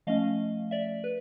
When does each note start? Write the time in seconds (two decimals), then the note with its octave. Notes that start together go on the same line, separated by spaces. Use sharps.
0.07 F3 A3 C#4 D#5 F5
0.71 D5 E5
1.04 B4